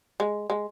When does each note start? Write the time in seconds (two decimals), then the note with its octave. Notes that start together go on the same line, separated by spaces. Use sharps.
0.20 G#3
0.50 G#3